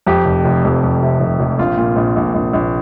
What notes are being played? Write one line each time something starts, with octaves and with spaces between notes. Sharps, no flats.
F2 G4
F1
F1
F2
F2
C3
F1
F1
A#1 F4
A#2
A#1
A#1
A#1
A#1